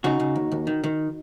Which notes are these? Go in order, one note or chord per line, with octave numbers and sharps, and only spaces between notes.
C#3 D#4 F#4
C#3
D#2
D#2
D#3
D#3